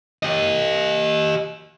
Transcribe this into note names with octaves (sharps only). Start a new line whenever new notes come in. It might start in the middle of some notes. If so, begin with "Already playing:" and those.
G4 D#5